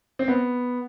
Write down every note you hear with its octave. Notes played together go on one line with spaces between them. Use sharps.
C4
B3